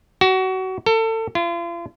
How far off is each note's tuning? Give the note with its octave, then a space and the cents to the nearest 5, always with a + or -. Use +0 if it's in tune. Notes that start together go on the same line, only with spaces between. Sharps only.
F#4 +25
A4 +30
F4 -40